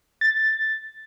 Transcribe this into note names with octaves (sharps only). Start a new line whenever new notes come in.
A6